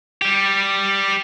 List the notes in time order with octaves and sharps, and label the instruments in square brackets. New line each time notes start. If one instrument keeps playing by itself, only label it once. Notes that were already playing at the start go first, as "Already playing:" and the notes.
[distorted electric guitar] G3 G4